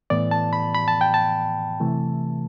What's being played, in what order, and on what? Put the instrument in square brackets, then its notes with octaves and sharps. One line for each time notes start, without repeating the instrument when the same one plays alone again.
[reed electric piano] A2 E3 B3 D5
A5
B5
B5
A5
G5
A5
C3 E3 A3